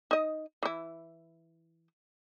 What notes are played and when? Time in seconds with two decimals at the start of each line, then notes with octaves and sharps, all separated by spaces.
0.11 D#4 D#5
0.63 E3 E4